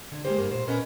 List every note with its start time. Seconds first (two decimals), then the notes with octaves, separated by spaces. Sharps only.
0.12 D3
0.25 G#3 A#3 G4 C5
0.39 G2 A#3
0.50 A#2 C5
0.67 A#2 C#4 A#4 B4 D#5